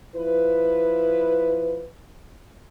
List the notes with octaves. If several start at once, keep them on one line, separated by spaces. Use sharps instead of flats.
F3 E4 B4